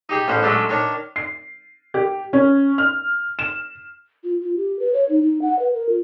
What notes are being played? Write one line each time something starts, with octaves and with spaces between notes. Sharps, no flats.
D#4 G4 G#4
A1 C#4 C5 F#5
F#3 G#3 A3 C#4 D4
D#3 D4 C#5
C7
G4
C#4
F6
E7
F4
F4
G4
B4
C#5
D#4
D#4
F#5
B4
A#4
F4